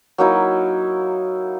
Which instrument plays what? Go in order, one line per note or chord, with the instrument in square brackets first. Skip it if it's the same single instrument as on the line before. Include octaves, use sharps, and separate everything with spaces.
[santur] F#3 A#3 D#4 E4